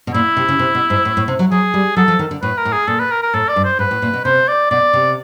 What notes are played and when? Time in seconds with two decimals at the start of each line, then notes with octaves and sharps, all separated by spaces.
0.07 B2
0.14 A#2 E4
0.37 C3
0.48 C#3
0.59 C3
0.75 B2
0.90 G#2
1.05 A2
1.17 A2
1.28 C3
1.39 F#3
1.51 F#3 G#4
1.74 G3
1.96 F#3 A4
2.08 F3
2.19 D#3
2.31 D3
2.42 A2 B4
2.57 A#4
2.65 A2
2.73 G#4
2.88 A#2 A4
2.99 B4
3.11 A#4
3.22 A#4
3.34 A2 A4
3.48 D5
3.56 G2
3.64 C5
3.79 G#2 B4
3.91 A2
4.02 A#2
4.14 B2
4.25 C3 C5
4.48 D5
4.71 B2 D5
4.93 C3